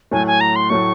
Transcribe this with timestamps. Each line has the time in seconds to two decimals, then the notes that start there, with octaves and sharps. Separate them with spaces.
0.11 A2 F#3 A3 G#5
0.27 G#5
0.41 A#5
0.56 C6
0.70 A2 F#3 A3 C#6